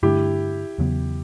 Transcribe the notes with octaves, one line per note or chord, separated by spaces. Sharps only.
G2 D3 A3 D4 E4 G4
E2 C#3 F#3 B3